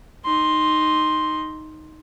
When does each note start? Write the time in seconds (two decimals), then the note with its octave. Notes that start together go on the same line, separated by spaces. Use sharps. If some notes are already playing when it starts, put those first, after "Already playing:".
0.25 D#4 C6